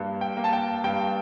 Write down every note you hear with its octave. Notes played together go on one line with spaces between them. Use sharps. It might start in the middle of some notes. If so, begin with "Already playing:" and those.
Already playing: G2 A#3
G5
A#3
A5
G5
G2 G5